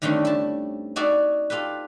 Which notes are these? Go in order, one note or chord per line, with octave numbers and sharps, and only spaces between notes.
G2 D3 D#3 A3 C4 C#4
E4 A5
D#4 F#4 G#4 D5 E5 F#5
F4 G4 A4 B4